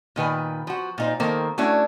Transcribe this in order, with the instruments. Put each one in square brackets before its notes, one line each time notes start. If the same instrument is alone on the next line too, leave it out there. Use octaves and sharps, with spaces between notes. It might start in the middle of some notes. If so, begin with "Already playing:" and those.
[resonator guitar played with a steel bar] A#2 D#3 B4 G#5
F3 F#4
A#2 D#4 C5
D#3 A#3 A4 C5
A3 C#4 D4 E4 F#4